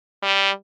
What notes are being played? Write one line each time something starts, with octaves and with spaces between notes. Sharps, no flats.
G3